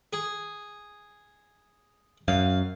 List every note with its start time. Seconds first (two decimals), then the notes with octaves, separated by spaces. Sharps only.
0.13 G#4
2.28 F#2 F5